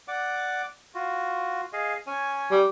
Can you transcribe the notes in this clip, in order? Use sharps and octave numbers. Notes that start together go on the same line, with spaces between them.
D5 F#5 D6
F4 F#4
G#4 D#5 F5
C#4 C#5 G#5
G3